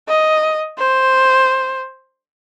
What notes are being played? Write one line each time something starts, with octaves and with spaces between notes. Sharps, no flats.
D#5
C5